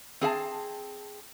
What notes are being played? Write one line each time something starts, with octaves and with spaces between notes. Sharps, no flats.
C4 G#4 F5 A5